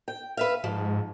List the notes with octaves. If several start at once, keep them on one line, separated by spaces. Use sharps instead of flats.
G5
B4 E5 F5
G#2 F3